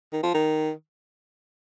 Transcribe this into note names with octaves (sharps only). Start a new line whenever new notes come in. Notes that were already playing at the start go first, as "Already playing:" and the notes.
D#3
F3
D#3